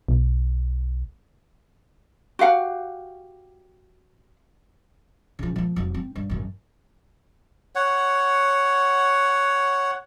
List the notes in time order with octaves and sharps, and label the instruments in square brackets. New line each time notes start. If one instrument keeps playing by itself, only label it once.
[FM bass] B1
[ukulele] F#4 G4 F5 F#5
[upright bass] C#3 F3
F3 A#3
F1 F#3
C4
G2
G#1 F#2
[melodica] C#5 F#5